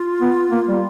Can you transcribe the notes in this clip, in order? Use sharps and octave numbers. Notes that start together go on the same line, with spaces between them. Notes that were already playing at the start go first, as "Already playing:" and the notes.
Already playing: F4
B3
A#3
G3